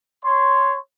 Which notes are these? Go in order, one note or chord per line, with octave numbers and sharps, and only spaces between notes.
C#5 C6